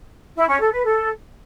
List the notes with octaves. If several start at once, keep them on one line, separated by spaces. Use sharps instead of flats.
E4
C#4
A4
B4
A4